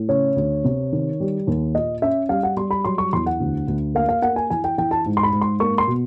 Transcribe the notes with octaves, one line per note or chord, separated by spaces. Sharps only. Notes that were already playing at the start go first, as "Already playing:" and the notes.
Already playing: A2
C#3 C#5
D2
C3
D#3
G3
D#2
A#2 D#5
C#4 E5
G3 F5
F#5
G3 C6
B5
F#3 C6
C#6
E2 C6
F#5
D2
D2
A#3 F5
F5
A#3 F#5
G#5
E3 G#5
G5
E3 G5
A5
G#2
C6
B5
G#2
C6
A#3 C#6
C6
B2